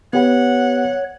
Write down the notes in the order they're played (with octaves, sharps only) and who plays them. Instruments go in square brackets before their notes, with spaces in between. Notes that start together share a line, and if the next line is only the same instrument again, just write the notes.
[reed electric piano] B3 G4 B4 [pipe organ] C#5 [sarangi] F#5